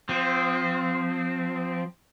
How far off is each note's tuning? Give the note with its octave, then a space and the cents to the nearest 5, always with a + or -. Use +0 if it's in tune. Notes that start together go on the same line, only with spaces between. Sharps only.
F3 +15 C4 -20